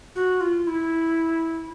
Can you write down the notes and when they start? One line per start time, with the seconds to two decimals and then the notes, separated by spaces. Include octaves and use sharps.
0.16 F#4
0.41 F4
0.67 E4